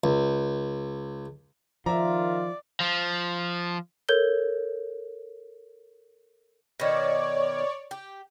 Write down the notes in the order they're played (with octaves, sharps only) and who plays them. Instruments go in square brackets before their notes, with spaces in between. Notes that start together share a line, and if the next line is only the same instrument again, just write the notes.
[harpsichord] C#2
[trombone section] D#3 F4 [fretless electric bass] F3 [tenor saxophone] D5 [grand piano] E5 A#5
[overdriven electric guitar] F3
[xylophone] A4 A#4 C#5 G6 G#6 G7
[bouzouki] B2 D#3 [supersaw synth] C#5 D5
[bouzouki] G4